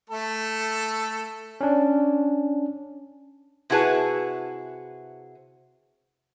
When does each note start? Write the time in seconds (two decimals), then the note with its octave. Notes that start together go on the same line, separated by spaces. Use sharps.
0.10 A3 A4
1.61 C#4 D4
3.70 C3 E4 F#4 G#4 B4 A5